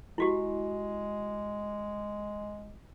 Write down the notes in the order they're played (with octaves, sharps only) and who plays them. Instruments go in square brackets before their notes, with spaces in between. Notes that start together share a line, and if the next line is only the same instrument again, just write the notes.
[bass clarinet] G#3 [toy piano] E4 F#4 G4